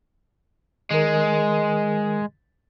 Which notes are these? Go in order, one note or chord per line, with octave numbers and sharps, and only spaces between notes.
D#3 G#3 A#4